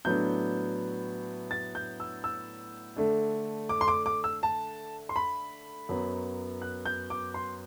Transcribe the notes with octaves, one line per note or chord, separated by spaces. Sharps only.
A2 F#3 B3 D4 G6
A6
G6
E6
E6
D3 A3 D4
D6
C6
D6
D6
E6
A5
C6
B5
F#2 F#3 B3
F#6
G6
D6
C6